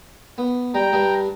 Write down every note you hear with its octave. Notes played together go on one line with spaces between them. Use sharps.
B3
G3 G5 A#5
G2 G3 D4